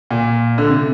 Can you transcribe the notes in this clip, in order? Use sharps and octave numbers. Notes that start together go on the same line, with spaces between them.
A#2
D3
C3